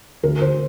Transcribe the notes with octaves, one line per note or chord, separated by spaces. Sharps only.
D2 A#4
D2 C5